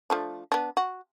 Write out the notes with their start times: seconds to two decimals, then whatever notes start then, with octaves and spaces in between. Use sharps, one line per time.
0.10 F3 A3 D4
0.52 B3 D4
0.77 F#4